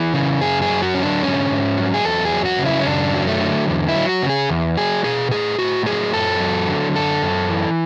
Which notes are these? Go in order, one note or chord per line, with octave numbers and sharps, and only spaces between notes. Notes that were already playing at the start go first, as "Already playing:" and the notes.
Already playing: E3 G#4
C#3
F#2 G#4
G#4
F#3
F#4
D3 C#4
D4
G#2 C#4
G#2
F#3
G#4
E2 A4
G#4
F#3
F#4
C#3
E4
C#4
F#2 D4
F#3
A3
D3
E2
E4
F#3
F#4
C#3
G#4
E2
F#3 G#4
B2 G#4
A2 G#4
A2 F#4
F#3 G#4
F#2 A4
F#3
D3
F#2 A4
F#2
E3